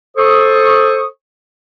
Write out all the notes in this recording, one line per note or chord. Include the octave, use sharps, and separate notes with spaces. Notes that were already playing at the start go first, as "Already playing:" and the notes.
A4 C5 C#6 D#6